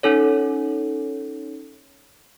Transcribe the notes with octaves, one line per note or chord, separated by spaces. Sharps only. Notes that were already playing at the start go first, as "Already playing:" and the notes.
C#4 D#4 A4 C#5